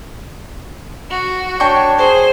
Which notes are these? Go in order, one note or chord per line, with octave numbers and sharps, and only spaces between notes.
F#4
D4 C#5 G5 C#6
G#4 C5